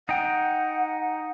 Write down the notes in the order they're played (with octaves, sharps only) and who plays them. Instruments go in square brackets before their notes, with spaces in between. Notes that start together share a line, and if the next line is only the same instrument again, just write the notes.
[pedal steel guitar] D#4 G5 [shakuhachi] F#5